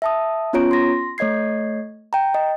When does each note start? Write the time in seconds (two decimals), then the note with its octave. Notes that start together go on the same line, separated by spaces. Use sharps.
0.02 E5 A5 D#6
0.53 B3 C#4 F4 C#5 A#5 D7
0.71 C6 A#6
1.18 A3 C#5 D#5 G#6 C7
2.13 G5 A#5
2.34 D#5